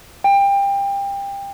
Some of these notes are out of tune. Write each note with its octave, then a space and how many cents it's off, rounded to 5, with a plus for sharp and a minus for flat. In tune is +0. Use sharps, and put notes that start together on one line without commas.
G5 +25